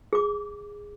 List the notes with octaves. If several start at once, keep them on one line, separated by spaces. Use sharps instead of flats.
G#4 D6